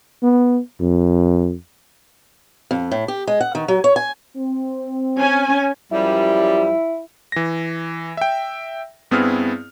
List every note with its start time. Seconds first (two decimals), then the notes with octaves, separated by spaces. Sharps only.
0.23 B3
0.80 F2
2.71 F2
2.91 A2
3.08 G4
3.27 G#3
3.41 F#5
3.55 D#3
3.68 F#3
3.84 C#5
3.96 G#5
4.36 C4
5.19 C#4 G#5
5.92 F#2 F3 G3 E4
7.32 E3 A#6
8.17 E5 G5
9.11 G2 B3 C4 E4 G#4 F6